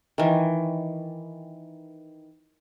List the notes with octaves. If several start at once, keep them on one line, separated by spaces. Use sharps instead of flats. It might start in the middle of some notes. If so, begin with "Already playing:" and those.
D#3 E3